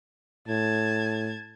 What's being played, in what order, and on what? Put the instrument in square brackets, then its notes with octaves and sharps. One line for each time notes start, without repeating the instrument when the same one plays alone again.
[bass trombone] A2 [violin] A5 G#6